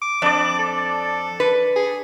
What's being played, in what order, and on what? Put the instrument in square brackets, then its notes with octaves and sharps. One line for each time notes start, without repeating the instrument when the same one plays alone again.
[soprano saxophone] D6
[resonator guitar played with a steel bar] F2 [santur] D4 D5
[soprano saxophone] A4
[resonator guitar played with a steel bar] B4
[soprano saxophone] G#4